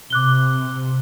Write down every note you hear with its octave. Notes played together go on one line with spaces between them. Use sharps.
C3 D6 F#6 G7